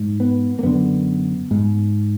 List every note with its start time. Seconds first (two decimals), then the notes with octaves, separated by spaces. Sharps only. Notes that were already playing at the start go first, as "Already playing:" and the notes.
Already playing: G#2
0.20 B3
0.59 A#3
0.63 F#2 D3 B3
1.51 G#2